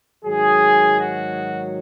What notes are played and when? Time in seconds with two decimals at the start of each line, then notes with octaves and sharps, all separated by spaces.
0.24 G#2 D#3 F#3 G#4
0.97 F#4